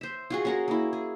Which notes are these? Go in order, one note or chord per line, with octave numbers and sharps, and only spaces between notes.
C5 E5
F4 F#4 G#4
C#4 F#4 A#4
A#3 E4
G#4